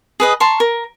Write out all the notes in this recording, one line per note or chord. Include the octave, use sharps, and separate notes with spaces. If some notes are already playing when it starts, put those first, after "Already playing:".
G#4 B4 D#5
A5 A#5 C6 C#6
A#4